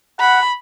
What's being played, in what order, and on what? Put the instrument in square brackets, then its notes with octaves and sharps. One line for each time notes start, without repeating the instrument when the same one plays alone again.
[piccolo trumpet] F#5 [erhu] B5